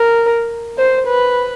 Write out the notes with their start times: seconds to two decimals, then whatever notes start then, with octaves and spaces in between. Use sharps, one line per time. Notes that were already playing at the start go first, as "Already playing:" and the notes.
Already playing: A#4
0.78 C5
1.07 B4